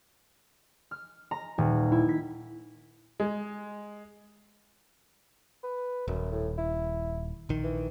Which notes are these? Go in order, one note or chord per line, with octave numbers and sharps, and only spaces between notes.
F6
A#5
D#1
E4
B6
G#3
B4
D#1 F#2
A2
E4
A#1 D#3
E3